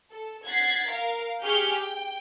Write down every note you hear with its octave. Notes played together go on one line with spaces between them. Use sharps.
A4
F#5 G#6 A6 B6 C7
A#4 F5
G4 G#4 C#6 F6 G6
G5